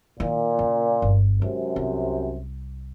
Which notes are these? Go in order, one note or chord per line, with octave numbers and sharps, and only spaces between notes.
A#2 D#3 F4
C#3
G1
F#2 C3 G#3
C2